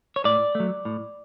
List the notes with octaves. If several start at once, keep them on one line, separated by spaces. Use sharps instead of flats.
C#5
A2 D5
F#3 A3
A2